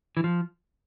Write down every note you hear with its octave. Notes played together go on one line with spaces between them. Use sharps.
E3
F3